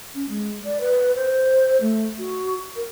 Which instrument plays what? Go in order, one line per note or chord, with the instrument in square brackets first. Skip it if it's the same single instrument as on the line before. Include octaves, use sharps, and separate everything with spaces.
[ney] C#4
G#3
D5
B4
C5
A3
F#4
A#4